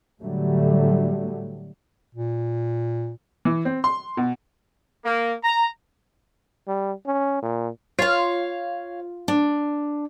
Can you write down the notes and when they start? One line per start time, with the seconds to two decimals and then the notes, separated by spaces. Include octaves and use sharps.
0.21 A2 D3 F#3 G3 A3
2.15 A#2
3.45 E3
3.65 C4
3.84 C6
4.17 B2
5.05 A#3
5.44 A#5
6.67 G3
7.06 C#4
7.42 A#2
7.99 F4 C#5 F5
9.28 D4